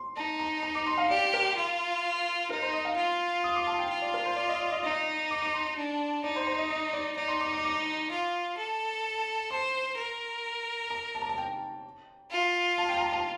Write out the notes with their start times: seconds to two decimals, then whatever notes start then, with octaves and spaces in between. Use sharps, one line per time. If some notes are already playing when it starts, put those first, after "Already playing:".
Already playing: C6
0.16 D#4 A5
0.39 A#5
0.63 A#5
0.75 D6
0.86 C6
0.98 F5
1.10 G4 D5
1.34 A#4
1.57 F4
2.50 D#4 A#4
2.62 C5
2.73 D#5
2.85 F5
2.96 F4
3.44 D#6
3.56 D6
3.67 A5
3.79 G5
3.90 F4
4.02 D5
4.14 A#4
4.25 C5
4.36 D5
4.49 D#5
4.60 D5
4.72 D#5
4.83 D#4 D#5
5.31 D6
5.42 D6
5.54 C6
5.77 D4
6.24 D#4 D5
6.36 C5
6.47 C5
6.59 D#5
6.71 D#5
6.93 D5
7.17 D#4 D5
7.28 C6
7.41 D6
7.52 D6
7.64 D6
8.11 F4
8.57 A4
9.51 C5 C6
9.97 A#4
10.90 A#5
11.15 A5
11.22 A#5
11.29 A5
11.38 G5
12.31 F4
12.78 A5
12.89 G5
12.97 A5
13.01 A#5
13.13 A5